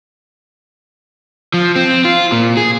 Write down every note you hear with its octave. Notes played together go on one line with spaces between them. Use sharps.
F3
C4
F4
A#2
G#4